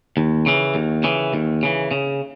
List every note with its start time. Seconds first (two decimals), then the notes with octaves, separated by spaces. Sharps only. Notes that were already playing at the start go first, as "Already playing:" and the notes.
0.17 D#2
0.46 C#3 E3
0.75 D#2
1.04 C#3 E3
1.34 D#2
1.63 C#3 E3
1.91 C#3